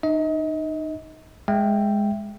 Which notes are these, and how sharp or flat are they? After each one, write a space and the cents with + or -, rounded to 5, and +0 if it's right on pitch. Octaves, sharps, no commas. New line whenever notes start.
D#4 -25 D#5 +35
G#3 -5 E5 +15 G5 +0